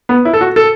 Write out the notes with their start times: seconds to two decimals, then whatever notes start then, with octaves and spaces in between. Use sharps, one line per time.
0.09 B3
0.25 E4
0.34 A4
0.41 F#4
0.56 A4